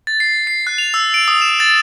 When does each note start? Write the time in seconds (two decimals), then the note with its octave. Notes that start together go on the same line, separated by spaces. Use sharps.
0.07 A6
0.20 C7
0.47 C7
0.67 F#6
0.78 F7
0.94 E6
1.14 D7
1.28 D#6
1.42 E7
1.60 A6